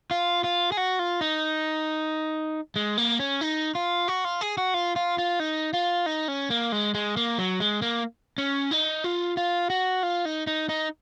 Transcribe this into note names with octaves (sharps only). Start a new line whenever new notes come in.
F4
F4
G#4
F#4
F4
D#4
G#3
A#3
C#4
D#4
F4
F#4
F4
G#4
F#4
F4
F4
F4
D#4
F4
D#4
C#4
A#3
G#3
G#3
A#3
F#3
G#3
A#3
C#4
D#4
F4
F4
F#4
F4
D#4
D#4
D#4